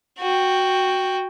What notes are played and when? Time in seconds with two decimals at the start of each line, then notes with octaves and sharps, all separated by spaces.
0.19 F#4 G5